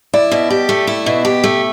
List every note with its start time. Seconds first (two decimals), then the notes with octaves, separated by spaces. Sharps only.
0.14 E4 D5
0.31 B2
0.50 G4
0.69 A3
0.87 E4
1.06 B2
1.25 G4
1.44 A3